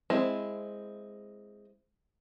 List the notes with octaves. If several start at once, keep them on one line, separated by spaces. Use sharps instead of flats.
G#3 C4 E4